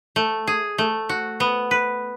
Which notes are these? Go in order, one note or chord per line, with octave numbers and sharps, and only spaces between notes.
A3
G#4
A3
F#4
B3
B4